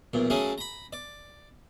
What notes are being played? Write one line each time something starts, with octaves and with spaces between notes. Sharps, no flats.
B1 E2 A#2
F#3 A3 A#3 C#4 G#4
A#5 B5
D5